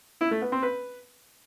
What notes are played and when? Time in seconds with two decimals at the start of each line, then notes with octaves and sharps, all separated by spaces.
0.21 E4
0.31 A3
0.42 B3
0.52 C4
0.63 B4